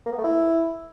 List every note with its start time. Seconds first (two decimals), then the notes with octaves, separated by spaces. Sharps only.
0.06 A#3
0.12 B3
0.18 A3
0.24 E4